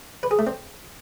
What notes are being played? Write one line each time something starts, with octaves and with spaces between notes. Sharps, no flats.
B4
G#4
A3
C4